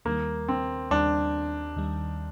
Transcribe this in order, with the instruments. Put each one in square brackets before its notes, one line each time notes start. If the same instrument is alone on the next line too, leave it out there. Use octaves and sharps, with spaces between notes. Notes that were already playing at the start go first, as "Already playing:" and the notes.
[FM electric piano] D#2 D#3 G3 [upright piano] A#3
[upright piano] C4
[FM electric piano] D#2 D#3 G3 [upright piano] D4
[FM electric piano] D#2 D#3 G3